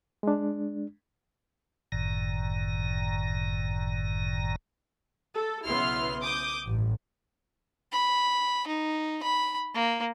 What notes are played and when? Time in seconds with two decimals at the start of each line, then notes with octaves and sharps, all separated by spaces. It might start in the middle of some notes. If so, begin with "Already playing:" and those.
0.23 G#3 D4
1.92 G1 F#2 A2 D#3 A#5
5.34 A4
5.65 B1 C#3 B3 E4 C6 F6
6.22 D6 D#6 G6
6.66 A1 G2
7.92 B5
8.67 D#4
9.23 B5
9.74 A#3